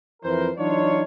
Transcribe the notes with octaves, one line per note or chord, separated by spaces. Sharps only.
F2 E3 A#4 C5
E3 F#3 D4 D#4 F4 C#5